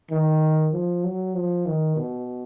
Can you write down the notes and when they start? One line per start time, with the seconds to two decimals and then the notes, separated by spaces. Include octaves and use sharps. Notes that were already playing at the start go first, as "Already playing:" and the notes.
0.11 D#3
0.73 F3
1.04 F#3
1.35 F3
1.66 D#3
1.96 B2